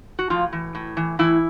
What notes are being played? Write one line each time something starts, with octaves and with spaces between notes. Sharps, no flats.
F#4
A2 F3 F4
E3
A2
E3
A2 E3 E4